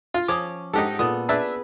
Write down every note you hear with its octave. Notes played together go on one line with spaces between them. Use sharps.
F4
F3 C#4 C#5 D6 D#6
G#2 D#4 G4 A4 F#5
A#2 B3 A4 D#6
D4 G#4 B4 E5 A5